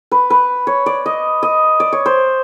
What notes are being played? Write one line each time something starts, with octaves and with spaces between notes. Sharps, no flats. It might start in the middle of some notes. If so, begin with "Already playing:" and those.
B4
B4
C#5
D5
D#5
D#5
D5
C#5
C5